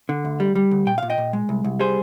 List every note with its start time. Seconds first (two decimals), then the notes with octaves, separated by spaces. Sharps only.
0.09 D3
0.25 D2
0.40 G3
0.55 G3
0.71 D2
0.87 A#2 G5
0.98 A#2 F5
1.10 D#5 G5
1.18 A#2
1.33 G#3
1.49 C2
1.64 C2
1.80 G3 G#4 C5